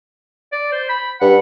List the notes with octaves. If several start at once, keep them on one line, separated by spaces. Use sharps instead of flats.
D5
C5
B5
G2 F#5